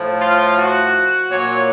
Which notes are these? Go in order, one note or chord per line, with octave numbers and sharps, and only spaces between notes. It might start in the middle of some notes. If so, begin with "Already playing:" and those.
Already playing: A2 F3
F4
F#4
A#2 F#3 C#5